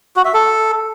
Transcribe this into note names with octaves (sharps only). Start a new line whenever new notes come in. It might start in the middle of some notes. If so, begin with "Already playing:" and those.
F#4
E5
A4